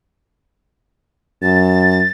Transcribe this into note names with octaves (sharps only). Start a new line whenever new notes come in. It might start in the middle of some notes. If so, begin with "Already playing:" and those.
F#2 A6